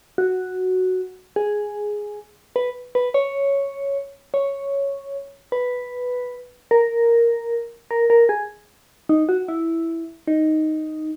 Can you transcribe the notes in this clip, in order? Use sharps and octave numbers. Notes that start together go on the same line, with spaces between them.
F#4
G#4
B4
B4
C#5
C#5
B4
A#4
A#4
A#4
G#4
D#4
F#4
E4
D#4